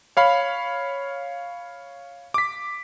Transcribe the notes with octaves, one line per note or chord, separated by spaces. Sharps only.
C#5 F5 B5
D6 B6